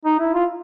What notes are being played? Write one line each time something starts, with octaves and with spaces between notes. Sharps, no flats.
D#4
E4
F4